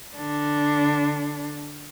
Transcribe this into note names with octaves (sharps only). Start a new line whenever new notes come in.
D3 D4